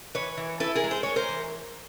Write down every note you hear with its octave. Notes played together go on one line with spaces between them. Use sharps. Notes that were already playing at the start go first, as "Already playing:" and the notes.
E3 B4 C#5
E3
E4 A4 B4
G#4 A#4
G#3
C5
G#3 C#5
A#4 C5
E3